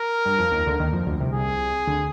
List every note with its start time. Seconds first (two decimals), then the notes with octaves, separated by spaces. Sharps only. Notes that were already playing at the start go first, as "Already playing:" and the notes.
Already playing: A#4
0.25 G2 G3
0.38 F2 F3
0.52 D#2 D#3
0.66 D2 D3
0.79 D#2 D#3
0.92 F2 F3
1.07 D2 D3
1.21 C2 C3
1.33 C2 C3 G#4
1.87 D2 D3